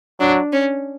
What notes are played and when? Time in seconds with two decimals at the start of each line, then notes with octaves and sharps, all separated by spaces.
0.20 F#3 D4
0.53 C#4